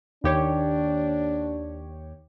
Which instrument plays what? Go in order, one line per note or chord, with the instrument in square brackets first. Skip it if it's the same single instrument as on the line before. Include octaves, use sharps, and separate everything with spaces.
[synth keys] D#2 G4 C#5 [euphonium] D4